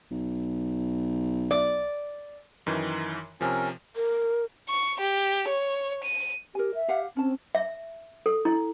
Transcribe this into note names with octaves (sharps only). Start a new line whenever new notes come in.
B1
D5
F#2 D#3 E3
C3 F3 C#4 A#4
A#4
C#6
G4
C#5
D#7
G4 A#4 G#5
E5
G4 F5 F#5
C4 C#4 A5
E5
A4
E4